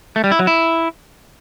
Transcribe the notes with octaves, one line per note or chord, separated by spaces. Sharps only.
A3
G3
E4
F#3
E4